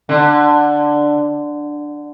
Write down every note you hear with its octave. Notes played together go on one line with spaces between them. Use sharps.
D3